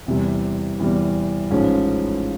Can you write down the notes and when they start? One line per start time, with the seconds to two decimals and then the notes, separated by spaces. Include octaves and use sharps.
0.06 E2 C3 E3 G3
0.79 E2 C3 E3 G3
1.51 A1 G#2 F3 G#3 C#4